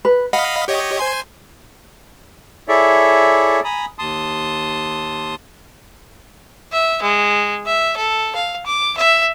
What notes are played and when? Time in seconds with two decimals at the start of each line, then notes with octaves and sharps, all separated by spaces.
0.05 B4
0.33 D#5 F5 F#5 B5
0.68 G4 C#5 D#5
0.99 C5 G#5 C6
2.68 E4 G#4 A4 C#5 D5 E5
3.64 G#5 A#5 B5 D#6
3.99 D#2 A5 C6 D#6
6.72 E5
7.02 G#3
7.66 E5
7.97 A4
8.35 F5
8.66 D6
8.98 E5